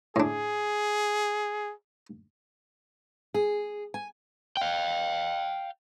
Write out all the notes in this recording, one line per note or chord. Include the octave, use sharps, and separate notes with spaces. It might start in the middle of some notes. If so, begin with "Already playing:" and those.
A2 D4 G#4
G#4
G#5
F5 G5